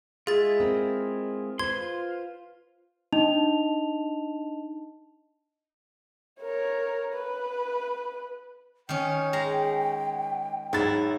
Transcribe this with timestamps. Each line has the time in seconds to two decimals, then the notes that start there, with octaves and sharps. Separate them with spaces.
0.27 G#3 E4 F4 G#4 A6
0.60 C4 A#4
1.59 B4 C5 C6 G#6
1.77 F4
3.12 D4 D#4 D#5 A5 F7
6.40 A#4 C#5
7.13 B4
8.89 D#3 C#4 G5
9.33 G#3 A#5
10.73 G#2 F#3 E4 A6